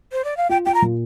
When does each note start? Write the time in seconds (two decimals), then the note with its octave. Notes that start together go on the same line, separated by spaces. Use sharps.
0.12 C5
0.24 D5
0.37 F5
0.49 F4 G5
0.66 F4 G5
0.74 A#5
0.82 A#2